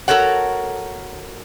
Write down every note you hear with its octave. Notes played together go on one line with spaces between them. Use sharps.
F#4 A4 A#4 C#5 F#5